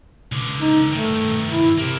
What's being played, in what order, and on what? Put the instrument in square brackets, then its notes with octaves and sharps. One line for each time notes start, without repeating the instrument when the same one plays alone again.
[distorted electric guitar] C#2 D3
[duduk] D#4
[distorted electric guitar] G2 D#3 [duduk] A3
[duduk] E4
[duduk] C3 [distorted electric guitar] A#3 E4